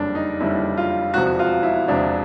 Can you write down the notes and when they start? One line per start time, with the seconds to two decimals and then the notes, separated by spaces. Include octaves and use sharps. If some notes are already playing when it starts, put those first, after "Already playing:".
Already playing: F#1 F2 D3 G3 D4
0.15 D#4
0.40 F#1 F2 D3 G3 E4
0.77 F4
1.14 E1 E2 C3 F3 F#4
1.27 F#4
1.39 F4
1.63 E4
1.88 E1 E2 C3 F3 D4